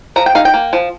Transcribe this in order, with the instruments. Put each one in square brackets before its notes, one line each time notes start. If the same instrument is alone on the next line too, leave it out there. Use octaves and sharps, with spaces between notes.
[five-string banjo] F3 A#5
G5
D#4 F5
G5
A#3
F3